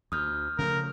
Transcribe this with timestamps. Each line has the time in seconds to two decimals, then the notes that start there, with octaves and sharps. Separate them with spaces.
0.12 D2 D#6 F6 G6
0.58 C#3 F3 A3 A#4